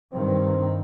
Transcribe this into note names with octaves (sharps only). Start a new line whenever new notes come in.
G2 D#3 C4